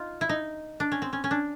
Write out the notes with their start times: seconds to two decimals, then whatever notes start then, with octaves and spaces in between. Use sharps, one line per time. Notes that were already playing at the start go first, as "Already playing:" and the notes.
Already playing: D#4 F4
0.21 E4
0.29 D#4
0.80 D4
0.92 C#4
1.02 C4
1.13 C#4
1.24 C#4
1.31 D4